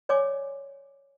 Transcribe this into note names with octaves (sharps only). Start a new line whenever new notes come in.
C#5 D5 G#5 C6 D6